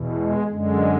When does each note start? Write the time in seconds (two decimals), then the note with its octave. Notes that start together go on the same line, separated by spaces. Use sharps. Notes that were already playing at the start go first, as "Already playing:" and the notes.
Already playing: E2 B2
0.14 G#3
0.47 F#2 D3 G#3